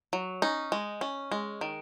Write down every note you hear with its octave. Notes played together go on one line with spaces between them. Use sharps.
F#3
C#4 D#4
G#3
C#4
G#3
D#3